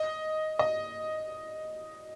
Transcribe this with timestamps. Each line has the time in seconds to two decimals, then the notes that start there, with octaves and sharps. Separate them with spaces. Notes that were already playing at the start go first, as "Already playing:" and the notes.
Already playing: D#5
0.59 D#5